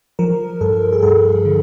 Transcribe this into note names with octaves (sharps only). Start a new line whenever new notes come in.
F3 A#4
G2 A4
G#4
G2 A4
D3